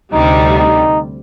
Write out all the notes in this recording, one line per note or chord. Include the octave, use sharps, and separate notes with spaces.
D2 C3 G3 D#4
D#4